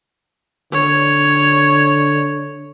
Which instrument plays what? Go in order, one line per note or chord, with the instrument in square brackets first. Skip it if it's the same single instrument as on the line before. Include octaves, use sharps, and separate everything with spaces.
[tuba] D3 [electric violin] C#5